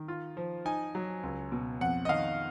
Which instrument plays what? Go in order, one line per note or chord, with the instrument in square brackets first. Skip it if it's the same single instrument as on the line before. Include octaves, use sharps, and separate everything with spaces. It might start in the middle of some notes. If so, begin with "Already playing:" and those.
Already playing: [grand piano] D#3
F4
F3
D#4 G#5
F#3
C#2
B2
F2 F#5
D#5
D#3 F5